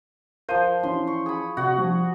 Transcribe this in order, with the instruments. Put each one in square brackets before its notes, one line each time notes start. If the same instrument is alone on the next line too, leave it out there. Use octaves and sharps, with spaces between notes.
[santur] F3 C5 [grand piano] A#4 F5 D#7
[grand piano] E3 C#4 F4 [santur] C6
[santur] C#6
G#4 B5
[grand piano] C3 [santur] F#4 F#5
[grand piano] F3 G3